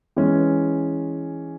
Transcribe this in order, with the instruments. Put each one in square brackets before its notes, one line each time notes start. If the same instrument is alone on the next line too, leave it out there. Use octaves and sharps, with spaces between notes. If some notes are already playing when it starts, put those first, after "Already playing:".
[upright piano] E3 G#3 C#4